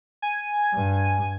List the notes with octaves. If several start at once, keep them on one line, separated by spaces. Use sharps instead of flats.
G#5
G2